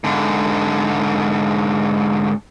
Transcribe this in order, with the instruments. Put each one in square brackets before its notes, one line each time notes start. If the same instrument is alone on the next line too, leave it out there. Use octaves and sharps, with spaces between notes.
[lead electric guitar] G#2 D3